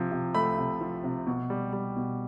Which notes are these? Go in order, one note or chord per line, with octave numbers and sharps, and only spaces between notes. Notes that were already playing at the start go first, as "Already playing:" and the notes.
Already playing: C3 F3
C3
A3 B5
C3
F3
C3
B2
G3
G3
B2